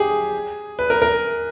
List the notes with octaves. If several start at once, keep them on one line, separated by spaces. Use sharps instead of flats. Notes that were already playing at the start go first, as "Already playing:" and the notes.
Already playing: G4 G#4
B4
A#4
A#4